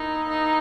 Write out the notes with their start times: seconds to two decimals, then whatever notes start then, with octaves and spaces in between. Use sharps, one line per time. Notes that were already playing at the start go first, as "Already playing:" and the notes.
Already playing: A#3 D#4 E4 A#4 D#5
0.30 D#4